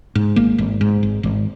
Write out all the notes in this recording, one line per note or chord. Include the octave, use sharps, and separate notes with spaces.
G#2
G#1 A#3
G#1
G#2
G#1
G#1